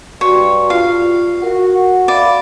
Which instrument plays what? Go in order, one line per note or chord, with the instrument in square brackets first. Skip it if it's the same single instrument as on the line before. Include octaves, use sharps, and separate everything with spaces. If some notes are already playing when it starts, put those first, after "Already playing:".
[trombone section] G2 [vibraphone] F#4 C6 [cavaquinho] C#5
[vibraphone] F4 [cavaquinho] F5
[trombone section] F#4 [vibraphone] A#4
[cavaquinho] D5 [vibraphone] E5 F5 B5